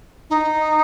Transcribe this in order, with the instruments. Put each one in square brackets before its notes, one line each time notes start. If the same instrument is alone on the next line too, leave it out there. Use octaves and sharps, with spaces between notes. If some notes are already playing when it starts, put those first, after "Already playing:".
[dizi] D#4